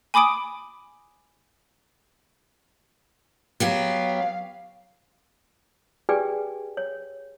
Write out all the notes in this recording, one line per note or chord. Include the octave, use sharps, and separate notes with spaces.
G#5 B5 D6 D#6 D7
F#3 B3 G4 F5
G4 G#4 B4 D5 G5 G#5
C#5